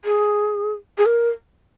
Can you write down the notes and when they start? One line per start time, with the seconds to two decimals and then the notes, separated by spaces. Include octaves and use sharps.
0.05 G#4
0.98 G#4
1.06 A#4